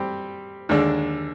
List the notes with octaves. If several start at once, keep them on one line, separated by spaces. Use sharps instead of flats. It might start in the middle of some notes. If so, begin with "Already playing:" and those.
Already playing: G3 C4 G4
D#2 D3 G#3 D4